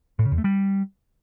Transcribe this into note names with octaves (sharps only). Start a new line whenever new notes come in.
A2
C#3
E2
A3
G3